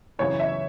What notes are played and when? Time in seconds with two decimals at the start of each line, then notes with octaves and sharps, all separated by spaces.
0.19 F#2 C#3 E3 C#5
0.40 E5